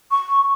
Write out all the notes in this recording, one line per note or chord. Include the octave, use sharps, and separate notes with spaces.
C#6